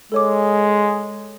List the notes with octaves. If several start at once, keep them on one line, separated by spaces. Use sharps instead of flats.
G#3 A4 C#5 D6